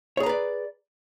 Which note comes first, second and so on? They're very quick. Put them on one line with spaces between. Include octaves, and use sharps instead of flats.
C#5 G#4 A#5 B4 D5